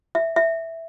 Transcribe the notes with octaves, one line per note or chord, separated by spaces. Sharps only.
E5
E5